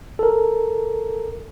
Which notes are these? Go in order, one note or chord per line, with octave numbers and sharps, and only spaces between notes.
A4 A#4